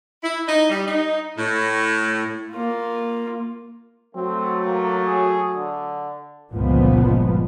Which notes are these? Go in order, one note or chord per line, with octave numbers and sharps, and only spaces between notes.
E4
D#4
G3
D#4
A2
A#3 F4
F#3 A3 C4
A#3
G#4
D3
G1 C#2 A#2 F3 B3